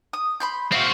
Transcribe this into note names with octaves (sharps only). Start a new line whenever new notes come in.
D#6
B5 C6 G6
C4 F#4 E5 F5